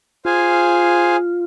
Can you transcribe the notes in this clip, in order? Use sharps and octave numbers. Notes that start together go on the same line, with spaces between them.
F4 G#4 C5 F5 G#5